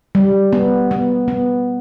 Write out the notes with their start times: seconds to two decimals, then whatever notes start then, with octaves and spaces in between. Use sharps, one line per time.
0.15 G3
0.53 B3
0.91 B3
1.28 B3